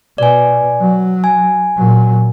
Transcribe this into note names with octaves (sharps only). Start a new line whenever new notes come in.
B2 D5 G#5
F#3
G#5
A#2 F#3